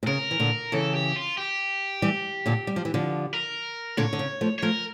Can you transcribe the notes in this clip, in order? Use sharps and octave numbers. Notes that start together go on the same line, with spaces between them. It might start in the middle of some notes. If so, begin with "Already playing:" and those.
A#2
C#3 A#4
E3
A#2 D3
C#3 E3 A4
G4
F4
G4
E3 G3
A#2 D3
G3
F3
E3
D3 F3
A#4
A#2 D3 C#5
D3
C#3
F3 A3
C#5
F3 A3 A#4